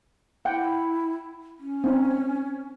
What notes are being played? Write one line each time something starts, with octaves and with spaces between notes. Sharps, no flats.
E4 F#5 G5
C#4
C4 D#4